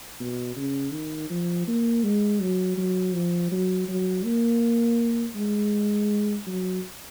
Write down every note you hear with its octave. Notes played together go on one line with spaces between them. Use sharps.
B2
C#3
D#3
F3
A#3
G#3
F#3
F#3
F3
F#3
F#3
A#3
G#3
F#3